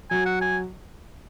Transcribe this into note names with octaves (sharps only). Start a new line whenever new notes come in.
F#3 G#5
F#5
G#5